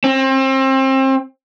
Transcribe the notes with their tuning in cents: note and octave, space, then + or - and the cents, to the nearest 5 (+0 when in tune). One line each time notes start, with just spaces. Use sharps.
C4 +30